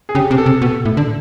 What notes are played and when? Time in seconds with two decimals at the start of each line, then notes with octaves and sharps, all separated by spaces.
0.09 G#4
0.15 C#3 G4
0.31 C3
0.38 A4
0.46 C3
0.62 B2
0.85 A2
0.97 D3